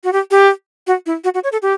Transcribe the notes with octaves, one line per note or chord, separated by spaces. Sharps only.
F#4
G4
G4
F#4
E4
F#4
F#4
C#5
A4
G4